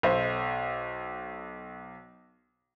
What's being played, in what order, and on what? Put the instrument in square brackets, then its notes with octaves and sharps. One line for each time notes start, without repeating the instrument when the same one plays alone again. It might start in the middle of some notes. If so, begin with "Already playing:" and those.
[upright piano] B1 C5